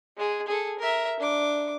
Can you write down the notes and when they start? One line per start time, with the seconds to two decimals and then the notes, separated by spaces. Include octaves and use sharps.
0.17 G#3 G#4
0.48 G#4 A4
0.79 A#4 E5
1.20 D4 D6